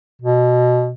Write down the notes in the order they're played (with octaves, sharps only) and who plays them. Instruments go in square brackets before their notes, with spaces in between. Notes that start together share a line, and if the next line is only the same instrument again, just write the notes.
[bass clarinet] B2